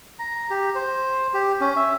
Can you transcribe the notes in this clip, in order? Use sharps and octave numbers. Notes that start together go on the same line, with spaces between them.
A#5
G4
C5
G4
C#4
E5